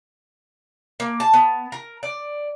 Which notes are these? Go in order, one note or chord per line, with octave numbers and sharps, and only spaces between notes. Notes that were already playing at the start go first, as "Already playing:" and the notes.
A#3
A5
B3
A#4
D5